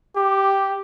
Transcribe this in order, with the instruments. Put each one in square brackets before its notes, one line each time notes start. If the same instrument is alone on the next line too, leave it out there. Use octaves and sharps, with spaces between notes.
[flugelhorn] G4 [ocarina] D6